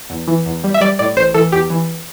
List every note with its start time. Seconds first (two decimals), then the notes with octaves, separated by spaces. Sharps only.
0.10 E2
0.28 E3
0.46 E2
0.64 G3
0.74 E5
0.81 G3 D5
0.99 A2 D5
1.17 A1 C5
1.34 E3 A4
1.52 E2 G4
1.70 E3